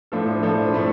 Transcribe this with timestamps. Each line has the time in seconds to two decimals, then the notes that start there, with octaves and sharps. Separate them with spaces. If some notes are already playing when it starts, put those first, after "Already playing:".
0.12 A2 F3 D4 A4
0.42 A2 F3 D4 A4
0.73 A2 A3 C4 A4